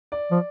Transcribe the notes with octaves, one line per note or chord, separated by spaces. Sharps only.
D5
F3